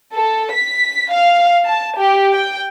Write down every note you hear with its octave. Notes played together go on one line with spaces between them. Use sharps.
A4
B6
F5
A5
G4
G5